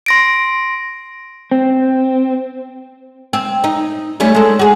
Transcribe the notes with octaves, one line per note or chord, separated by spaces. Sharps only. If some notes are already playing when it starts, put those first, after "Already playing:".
C6 A#6 D7
C4
C4
D#4
G3 A3 C#4
G#3 A4
F#4 G#4